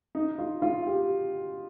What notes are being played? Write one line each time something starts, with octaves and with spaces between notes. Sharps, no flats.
D#4
F4
F4
G4